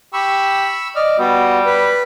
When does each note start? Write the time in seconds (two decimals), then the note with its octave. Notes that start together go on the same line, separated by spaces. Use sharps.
0.13 G4 B5 C#6 E6
0.96 D5 D#5 F6
1.19 G3 B3 F#4
1.66 B4